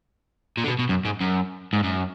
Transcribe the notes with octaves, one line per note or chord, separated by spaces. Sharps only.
A#2
D3
B2
B2
F#2
G#2
F#2
G#2
F#2